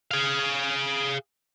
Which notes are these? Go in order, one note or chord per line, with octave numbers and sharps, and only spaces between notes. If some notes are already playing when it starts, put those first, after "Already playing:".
G#4 F5